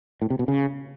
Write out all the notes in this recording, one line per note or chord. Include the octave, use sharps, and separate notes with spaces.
A2
C3
B2
C#3